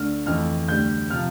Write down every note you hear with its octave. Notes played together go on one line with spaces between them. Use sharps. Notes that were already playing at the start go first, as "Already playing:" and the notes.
Already playing: D2 D3 A3 F6
F2 E3 A3 F6
D2 D3 G3 G6
C3 F3 F6